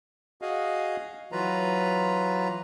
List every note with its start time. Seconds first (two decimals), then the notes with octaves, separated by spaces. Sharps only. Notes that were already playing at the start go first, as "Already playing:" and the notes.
0.42 F#4 G#4 D#5 F5
1.32 E3 F#3 F4 B4 A#5